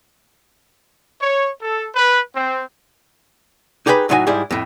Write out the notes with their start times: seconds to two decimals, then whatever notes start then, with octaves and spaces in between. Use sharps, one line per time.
1.22 C#5
1.62 A4
1.95 B4
2.36 C4
3.86 D#4 G4 G#4 B4 F5 B5
4.09 A2 F#3 D#4 E4 F#4 G#5
4.27 G#2 G3 E4 G#4
4.51 F2 A2